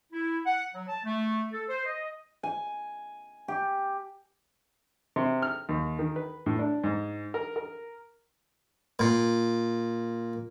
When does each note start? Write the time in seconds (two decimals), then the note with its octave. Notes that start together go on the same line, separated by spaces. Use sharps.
0.13 E4
0.46 F#5
0.75 F#3
0.88 A5
1.04 A3
1.53 A4
1.69 C5
1.86 D#5
2.43 G#5
3.48 G4
5.16 C3
5.42 F6
5.69 D#2
5.99 D#3
6.16 B4
6.46 A2
6.59 D4
6.84 G#2
7.34 A#4
7.56 A#4
8.99 A#2